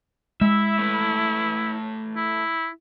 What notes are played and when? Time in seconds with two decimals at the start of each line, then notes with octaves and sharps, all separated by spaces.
0.41 G#3 E4 E5
0.79 A3 B4
2.17 E4